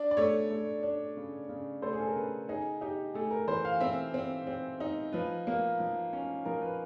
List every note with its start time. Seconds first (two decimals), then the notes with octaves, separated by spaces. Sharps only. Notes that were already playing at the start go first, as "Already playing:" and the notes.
Already playing: D4 D5
0.11 D5
0.17 A3 C#5
0.50 A3
0.83 D4
1.17 C#3
1.49 C#3
1.82 A3 C5
1.93 G#4
2.00 A4
2.08 A#4
2.16 C#3 B4
2.49 D#4 G#4
2.81 D#4 G4
3.14 A3 G#4
3.31 A#4
3.48 E3 C5
3.65 F5
3.80 C4 E5
4.14 C4
4.47 C4
4.80 D#4
5.13 F3 B4
5.47 A#3
5.80 F3
6.13 C#4
6.45 F3 A#4
6.62 B4